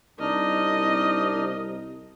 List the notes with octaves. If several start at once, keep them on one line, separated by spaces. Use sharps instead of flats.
C2 D4 D#4 D#5 F6